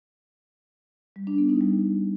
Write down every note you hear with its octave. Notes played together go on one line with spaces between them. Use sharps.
G3
D4
B3
D#4
G3